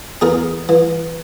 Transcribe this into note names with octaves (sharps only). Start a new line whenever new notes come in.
E2 G#4 A#4
E3